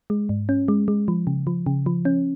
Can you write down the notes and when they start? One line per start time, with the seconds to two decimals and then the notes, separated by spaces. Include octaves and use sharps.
0.10 G#3
0.29 G#2
0.49 C#4
0.68 G#3
0.88 G#3
1.08 F3
1.27 C#3
1.47 F3
1.66 C#3
1.86 F3
2.05 C#4